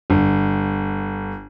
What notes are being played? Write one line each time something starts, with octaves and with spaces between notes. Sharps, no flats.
G1